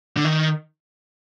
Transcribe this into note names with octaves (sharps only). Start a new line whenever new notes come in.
D3
D#3